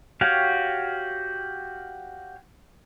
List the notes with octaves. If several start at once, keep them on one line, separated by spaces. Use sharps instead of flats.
F#4 G4 C#5 F5